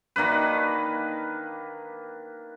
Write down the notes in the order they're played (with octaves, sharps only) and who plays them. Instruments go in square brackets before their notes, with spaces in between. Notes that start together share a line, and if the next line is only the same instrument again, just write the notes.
[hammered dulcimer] D#3 A#3 D4 B4